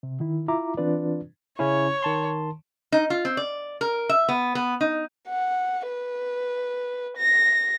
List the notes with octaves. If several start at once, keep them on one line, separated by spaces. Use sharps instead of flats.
C3
D#3 E4
E4 F4 E5 A#5 D6
E3 C4 D4 F4 B4 D5
C#3 C#4 E4 C#5
D#3 A5 C6
D#4
F4
C4
D5
A#4
E5
B3
B3
D#4
F#5
B4
A#6